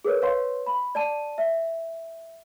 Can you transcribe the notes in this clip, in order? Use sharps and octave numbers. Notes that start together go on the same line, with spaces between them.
G#4 A#4 B4 C#5
B4 C#5 F5 C6
B5
D5 A5 D#7
E5